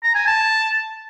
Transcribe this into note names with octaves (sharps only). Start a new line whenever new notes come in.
A#5
G#5
A5